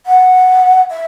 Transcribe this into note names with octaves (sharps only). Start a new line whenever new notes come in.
F#5
E5